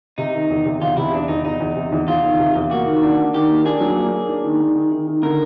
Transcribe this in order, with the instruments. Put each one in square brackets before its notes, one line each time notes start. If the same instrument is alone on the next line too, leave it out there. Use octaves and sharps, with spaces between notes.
[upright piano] C3 [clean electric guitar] D#4
[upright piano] D#3
E2
C3
[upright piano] E2 [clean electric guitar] F4
[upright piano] C3 [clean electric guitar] E4
[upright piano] E2 [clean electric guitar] D4
[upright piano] E2 [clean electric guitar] D#4
[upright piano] E2 [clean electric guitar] D#4
[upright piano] E2
C3
E2
[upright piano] E2 [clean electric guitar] F4
[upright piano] D#3
C3
E2
[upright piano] A#3 [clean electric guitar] F#4
[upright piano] D#3
D4
A#3
[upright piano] D#3 [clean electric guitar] G4
[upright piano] A#3
[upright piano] D4 [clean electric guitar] G#4
[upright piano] F#3
A#3
A#3
D4
D#3
D#3
D#3
D#3
D#3
[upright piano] D3 [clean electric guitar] A#4